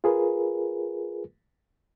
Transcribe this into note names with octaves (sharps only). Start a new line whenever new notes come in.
F4 G#4 A#4 B4